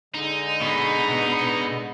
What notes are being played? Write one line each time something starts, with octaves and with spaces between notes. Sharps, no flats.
D3 G#3 D#4
B2 B3